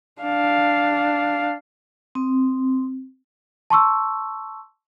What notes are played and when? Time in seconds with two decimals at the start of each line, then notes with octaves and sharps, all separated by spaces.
0.22 D4 F5
2.15 C4
3.70 A5 C6 C#6 E6